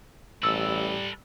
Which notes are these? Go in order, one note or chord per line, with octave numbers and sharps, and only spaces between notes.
A1 G3 A4 B4 E6